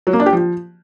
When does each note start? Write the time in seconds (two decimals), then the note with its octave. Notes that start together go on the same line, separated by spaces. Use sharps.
0.07 F#3
0.13 A#3
0.20 D4
0.26 G4
0.33 F3